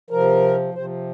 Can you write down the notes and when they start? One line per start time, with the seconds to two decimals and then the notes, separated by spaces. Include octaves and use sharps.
0.10 C3 F3 A#4
0.74 C3 F3 C5